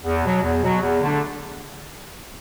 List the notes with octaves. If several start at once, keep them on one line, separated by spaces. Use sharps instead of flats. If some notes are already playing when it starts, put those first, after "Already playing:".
E2
B2 F#3
E2
B2 F#3
E2
D3 A3 D4